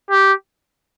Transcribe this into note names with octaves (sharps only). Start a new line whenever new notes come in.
G4